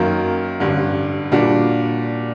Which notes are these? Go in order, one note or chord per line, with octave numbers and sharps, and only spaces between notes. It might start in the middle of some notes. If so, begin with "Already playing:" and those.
Already playing: F#2 D#3 F#3 A#3
A1 G2 D3
A#2 G3 D4 F#4